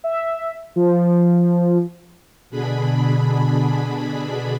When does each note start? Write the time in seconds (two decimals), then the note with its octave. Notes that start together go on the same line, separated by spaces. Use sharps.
0.04 E5
0.76 F3
2.50 B2 D3 D4 G#4 B5